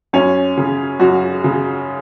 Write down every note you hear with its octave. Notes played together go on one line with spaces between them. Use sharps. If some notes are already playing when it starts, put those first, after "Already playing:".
F#2 C#4
C#3
F#2 F#4
C#3